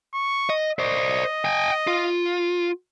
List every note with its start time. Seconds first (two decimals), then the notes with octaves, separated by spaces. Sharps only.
0.14 C#6
0.50 D#5
0.79 C5 D5 D#5
1.45 G5 G#5
1.87 F4